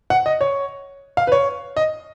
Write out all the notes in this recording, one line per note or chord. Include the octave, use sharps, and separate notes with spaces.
F#5
D#5
C#5
F5
B4
C#5
D#5